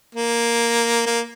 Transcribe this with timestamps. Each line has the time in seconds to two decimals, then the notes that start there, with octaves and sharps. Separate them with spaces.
0.15 A#3
1.06 A#3